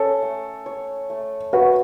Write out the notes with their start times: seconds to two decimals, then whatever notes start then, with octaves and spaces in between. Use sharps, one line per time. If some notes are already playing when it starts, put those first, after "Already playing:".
Already playing: C#4 A4
0.22 A3
0.66 C#5
1.10 A3
1.53 A3 F#4 B4